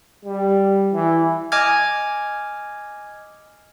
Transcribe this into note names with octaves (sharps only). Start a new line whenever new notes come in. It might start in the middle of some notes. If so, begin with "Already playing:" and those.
G3
E3
D#5 G#5 D6 F6 G#6